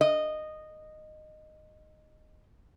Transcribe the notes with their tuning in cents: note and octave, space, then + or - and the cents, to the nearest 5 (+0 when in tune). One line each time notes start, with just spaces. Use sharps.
D#5 -10